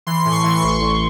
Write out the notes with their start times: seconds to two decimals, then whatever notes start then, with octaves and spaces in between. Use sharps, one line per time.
0.07 E3 C6
0.21 A2 C6
0.31 C#6
0.44 E3 C#6
0.56 C6
0.63 A1
0.81 A1